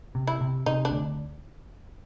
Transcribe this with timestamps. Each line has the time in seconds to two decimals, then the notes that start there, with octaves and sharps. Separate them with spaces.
0.15 C3
0.27 E4
0.41 C3
0.66 C3 D#4
0.85 D4
0.91 D2